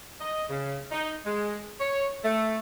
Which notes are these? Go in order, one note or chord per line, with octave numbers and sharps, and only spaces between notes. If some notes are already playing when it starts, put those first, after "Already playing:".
D#5
C#3
D#4
G#3
C#5
A3